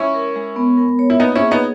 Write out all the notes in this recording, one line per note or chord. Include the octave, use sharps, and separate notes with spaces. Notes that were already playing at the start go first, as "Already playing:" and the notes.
Already playing: G#3 C#4 E4
A#4
G#3
B3
A#4
C#5
E4
A#3 B3 D#4
C#4 E4
G#4
B3 D#4